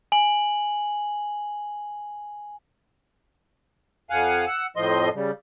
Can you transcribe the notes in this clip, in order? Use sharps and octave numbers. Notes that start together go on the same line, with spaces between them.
G#5 F#7
F2 F5 F#5 G#5
F#5 E6
F2 A2 F3 D#5 C6
C#3 G3